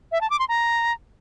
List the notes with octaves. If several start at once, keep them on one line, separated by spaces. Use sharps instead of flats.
E5
A5
D6
C6
A#5